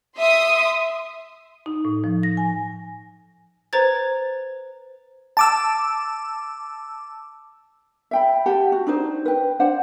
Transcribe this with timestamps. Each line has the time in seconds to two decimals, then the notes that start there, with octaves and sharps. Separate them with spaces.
0.17 E5 C6 D#6
1.66 D#4
1.85 A2
2.04 F3
2.23 A#6
2.37 G#5
3.73 B4 C5 A#5 G#6 A6
5.37 A5 D6 E6
8.11 E5 G5 B5
8.46 G4 F#5 A5
8.72 F#4
8.87 D4 D#4 C5
9.25 B4 G5
9.60 D4 C5 F#5